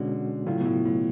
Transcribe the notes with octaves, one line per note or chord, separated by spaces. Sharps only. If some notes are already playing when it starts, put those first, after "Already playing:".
Already playing: B2 D3 G#3 C#4 F#4
A2 C#3 F#3 A3 F4
B2
A2
A2